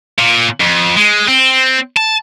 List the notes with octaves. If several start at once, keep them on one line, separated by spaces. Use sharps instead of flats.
A#2
F2
G#3
C4
A5